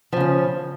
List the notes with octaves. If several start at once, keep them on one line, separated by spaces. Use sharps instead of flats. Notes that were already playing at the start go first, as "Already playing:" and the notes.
C#3 F3 C#4